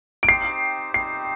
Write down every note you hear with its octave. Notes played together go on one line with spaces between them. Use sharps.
D7
C4 D#4 G4 C5 C7
C4 D#4 G4 C5 C7